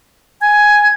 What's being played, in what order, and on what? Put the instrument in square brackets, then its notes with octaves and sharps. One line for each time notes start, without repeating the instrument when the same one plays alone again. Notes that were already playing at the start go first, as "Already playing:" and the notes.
[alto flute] G#5 [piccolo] G#6